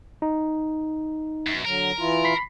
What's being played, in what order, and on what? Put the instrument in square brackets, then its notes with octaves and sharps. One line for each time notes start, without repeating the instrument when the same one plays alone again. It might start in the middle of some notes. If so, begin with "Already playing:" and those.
[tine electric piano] D#4
[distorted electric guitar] F#2 [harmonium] B2
[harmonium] D3 F#3 [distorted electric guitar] A#4
[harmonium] E3 E4 F4
[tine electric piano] B5 B6 C7